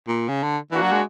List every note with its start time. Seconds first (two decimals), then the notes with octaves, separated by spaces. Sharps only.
0.08 A#2
0.29 C#3
0.43 D3
0.72 E3 A#3 D4 F#4
0.82 F#3
0.92 G#3